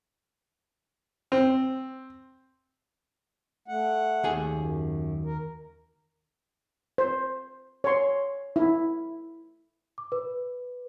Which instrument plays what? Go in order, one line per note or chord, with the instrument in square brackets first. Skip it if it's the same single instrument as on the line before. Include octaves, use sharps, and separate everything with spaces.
[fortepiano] C4
[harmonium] A3 F#5
[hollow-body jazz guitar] D#2 G#4 G#5
[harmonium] F#2
A#4
[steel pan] C5
C#5 C6
E4
[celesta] D6
B4